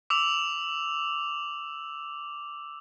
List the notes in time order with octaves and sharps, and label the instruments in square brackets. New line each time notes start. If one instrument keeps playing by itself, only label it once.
[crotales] D6 E6 F7